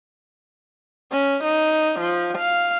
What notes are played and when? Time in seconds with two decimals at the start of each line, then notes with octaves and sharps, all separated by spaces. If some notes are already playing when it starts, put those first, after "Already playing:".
1.12 C#4
1.44 D#4
2.00 F3
2.38 F5